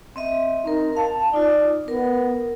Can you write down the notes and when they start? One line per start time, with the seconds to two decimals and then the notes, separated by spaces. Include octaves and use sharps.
0.16 C4 D#5 E5
0.66 C4 D#4 A#4
0.97 F5 A5
1.33 D#4 F4 D5
1.88 B3 A#4